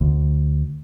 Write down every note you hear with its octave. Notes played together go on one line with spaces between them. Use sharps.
D2